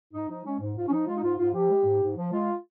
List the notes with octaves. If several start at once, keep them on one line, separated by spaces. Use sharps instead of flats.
G#2 D#4
F3 D#4
G#3 C#4
G#2
G#2 F4
C#4
F3 D#4
G#3 F4
D#4
G#2 F4
G#2 F4
F3 G4
G#3
G#2
G#2
F3
G#3 F4